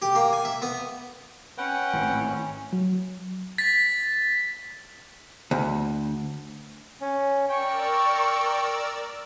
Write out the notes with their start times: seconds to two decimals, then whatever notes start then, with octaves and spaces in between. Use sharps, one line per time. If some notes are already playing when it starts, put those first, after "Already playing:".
0.02 G4
0.15 A#3
0.33 G#5
0.45 E5
0.62 B3
1.58 C#4 B4 F#5 G5
1.93 G#1 A2
2.73 F#3
3.58 A6 B6
5.51 D2
7.01 C#4
7.49 A#4 D5 G5 C#6 E6